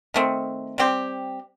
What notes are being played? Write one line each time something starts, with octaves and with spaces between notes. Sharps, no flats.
D#3 A3 C4
G3 C4 G4